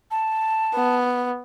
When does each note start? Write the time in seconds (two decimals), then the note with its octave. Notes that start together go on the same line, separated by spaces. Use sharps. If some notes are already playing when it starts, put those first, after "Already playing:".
0.11 A5
0.74 B3